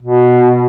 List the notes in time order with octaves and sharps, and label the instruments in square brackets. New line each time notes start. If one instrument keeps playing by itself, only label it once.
[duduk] B2